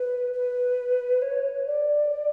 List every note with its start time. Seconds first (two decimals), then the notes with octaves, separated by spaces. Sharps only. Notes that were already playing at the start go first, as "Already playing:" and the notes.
Already playing: B4
0.33 B4
1.21 C#5
1.66 D5